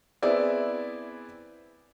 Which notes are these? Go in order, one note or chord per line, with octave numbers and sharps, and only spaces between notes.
B3 C4 E4 G#4 D5 E5